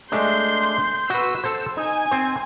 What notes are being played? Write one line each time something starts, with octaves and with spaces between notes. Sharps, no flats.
G#3 A3 D4 C6 G6
F#4 B4 E6
A4 C5
D#4 G#5
C4 C5